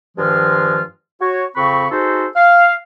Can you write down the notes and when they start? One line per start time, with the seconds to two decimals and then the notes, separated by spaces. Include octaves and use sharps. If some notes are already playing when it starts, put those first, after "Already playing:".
0.18 G2 D#3 F3 G#3 F4 F6
1.21 F#4 C#5
1.57 F2 C#3 C4 B5 C#6
1.91 G#3 D#4 F#4 A4 C5
2.36 F5